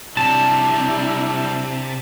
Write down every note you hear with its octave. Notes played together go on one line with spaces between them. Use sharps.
C3 F#3 G3 D4 E4 A5